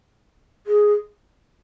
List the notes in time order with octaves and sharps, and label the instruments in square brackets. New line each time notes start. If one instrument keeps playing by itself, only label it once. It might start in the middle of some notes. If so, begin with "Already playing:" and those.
[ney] G#4